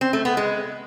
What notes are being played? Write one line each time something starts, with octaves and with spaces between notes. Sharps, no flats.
C4
A3
B3
G#3